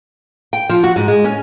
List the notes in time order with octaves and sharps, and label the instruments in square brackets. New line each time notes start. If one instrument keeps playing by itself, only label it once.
[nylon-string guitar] G5
F3
F#4
G#2
G#3
C#4